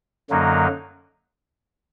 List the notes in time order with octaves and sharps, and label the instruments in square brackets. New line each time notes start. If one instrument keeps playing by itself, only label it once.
[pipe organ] F#2 D3 F#3 A#3 D#4